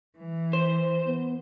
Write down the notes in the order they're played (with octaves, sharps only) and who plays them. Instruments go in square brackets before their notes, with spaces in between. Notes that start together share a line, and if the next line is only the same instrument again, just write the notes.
[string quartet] E3
[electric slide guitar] C5
[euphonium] B3